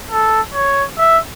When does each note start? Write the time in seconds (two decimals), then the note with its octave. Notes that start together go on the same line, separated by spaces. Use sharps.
0.11 A4
0.54 C#5
0.98 E5